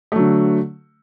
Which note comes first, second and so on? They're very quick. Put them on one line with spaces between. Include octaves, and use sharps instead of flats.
A3 F#3 D3